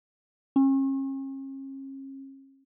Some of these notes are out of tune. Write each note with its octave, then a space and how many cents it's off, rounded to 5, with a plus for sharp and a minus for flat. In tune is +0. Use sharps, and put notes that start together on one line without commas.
C#4 -40